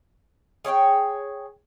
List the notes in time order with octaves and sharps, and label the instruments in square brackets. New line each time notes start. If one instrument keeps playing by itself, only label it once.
[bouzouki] G#4 C#5 D5 G5